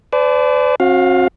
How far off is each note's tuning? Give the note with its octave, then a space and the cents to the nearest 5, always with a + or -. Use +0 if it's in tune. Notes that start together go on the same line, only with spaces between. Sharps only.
B4 +45 D5 -10 A5 -35
C4 +40 F#4 -25 F5 +15